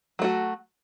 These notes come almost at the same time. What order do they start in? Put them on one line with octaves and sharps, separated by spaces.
F#3 A3 F#4